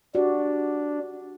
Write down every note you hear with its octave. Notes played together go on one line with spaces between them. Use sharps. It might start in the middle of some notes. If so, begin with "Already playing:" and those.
D4 F#4 G4 D5